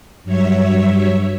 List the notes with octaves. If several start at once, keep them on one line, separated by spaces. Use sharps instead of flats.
G2 F#3 C#5 E5